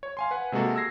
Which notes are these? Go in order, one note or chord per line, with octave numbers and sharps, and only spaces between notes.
C#5
F5 G#5 C6
B4 F#5 G#5
C3 G#3 A#3 F#4 A4
E6 G#6 A#6 C7